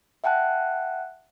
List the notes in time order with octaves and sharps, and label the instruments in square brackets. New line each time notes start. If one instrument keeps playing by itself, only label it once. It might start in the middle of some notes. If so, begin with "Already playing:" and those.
[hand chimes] E5 F#5 G5 A5 F#6